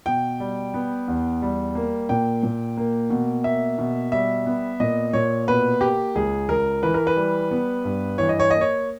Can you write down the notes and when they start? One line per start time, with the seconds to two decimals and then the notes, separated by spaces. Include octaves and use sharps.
0.06 B2 G5
0.40 G3
0.74 B3
1.08 E2
1.42 G3
1.75 A#3
2.09 A#2 G5
2.43 A#2
2.77 A#3
3.10 B2
3.44 A#3 E5
3.79 B2
4.12 G3 E5
4.46 B3
4.80 A#2 D#5
5.13 A#2 C#5
5.48 B2 B4
5.81 A#3 G4
6.15 C#2 G#4
6.49 C#2 A#4
6.83 E3 B4
6.94 A#4
7.07 B4
7.16 G3
7.51 B3
7.85 G2
8.18 E3 C#5
8.29 D#5
8.40 C#5
8.51 A#3 D#5
8.61 C#5